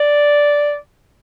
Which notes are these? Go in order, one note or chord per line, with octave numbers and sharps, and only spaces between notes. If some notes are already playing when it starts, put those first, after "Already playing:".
Already playing: D5